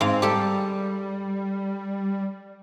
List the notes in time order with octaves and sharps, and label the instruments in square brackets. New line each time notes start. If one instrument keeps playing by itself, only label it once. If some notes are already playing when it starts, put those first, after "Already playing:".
[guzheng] G#2 F5 [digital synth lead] C4
[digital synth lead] G3 [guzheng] G4 A4